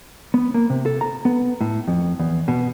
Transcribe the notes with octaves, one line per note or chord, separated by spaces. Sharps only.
B3
A#3
C3
A4
A#5
B3
A2
F2
E2
B2